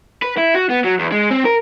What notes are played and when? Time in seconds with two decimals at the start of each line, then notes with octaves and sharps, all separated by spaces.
0.22 B4
0.38 E4
0.55 F#4
0.70 B3
0.84 F#3
0.99 E2
1.12 G#3
1.31 C4
1.45 A#4